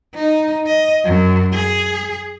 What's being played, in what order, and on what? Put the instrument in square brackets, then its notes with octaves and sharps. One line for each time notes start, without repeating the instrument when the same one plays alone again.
[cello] D#4
D#5
F#2
G#4